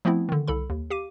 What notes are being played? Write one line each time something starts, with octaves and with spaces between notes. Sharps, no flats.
F3 A3 B3 C4 E4
D3 D#3
C2 A4 B5
D#2
G4 F5 D6 D#7